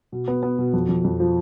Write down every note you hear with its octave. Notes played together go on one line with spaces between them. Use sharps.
B2
B3
B3
B2
F2
F2
F2
F3